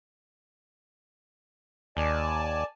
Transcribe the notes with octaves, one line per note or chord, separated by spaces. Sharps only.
D#2 D5 G#5 A5